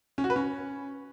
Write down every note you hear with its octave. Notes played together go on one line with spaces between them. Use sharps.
C#4
F#4
B4
C#4